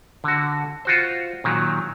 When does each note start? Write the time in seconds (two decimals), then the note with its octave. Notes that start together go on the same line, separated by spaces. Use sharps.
0.24 D3 F#4
0.85 F4 F#4 C5
1.44 A#2 D#3 F#3